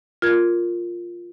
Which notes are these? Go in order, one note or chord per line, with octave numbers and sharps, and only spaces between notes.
F4 A#4 G#6